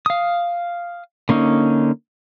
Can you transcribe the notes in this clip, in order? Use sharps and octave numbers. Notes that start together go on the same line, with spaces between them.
F5 D#6
D3 A#3 C#4 D#4